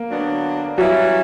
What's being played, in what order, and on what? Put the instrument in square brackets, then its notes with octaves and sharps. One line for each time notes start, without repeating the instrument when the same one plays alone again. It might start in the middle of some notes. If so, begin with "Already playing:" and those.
Already playing: [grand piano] A#3
[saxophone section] D3 F#3 B3 D4
[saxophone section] E3 G3 C#4 E4 [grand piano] F#3 F#4